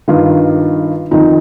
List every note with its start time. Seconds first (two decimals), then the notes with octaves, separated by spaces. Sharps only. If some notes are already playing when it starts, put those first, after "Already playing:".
0.08 G2 D#3 F4
1.11 F2 D#3 D#4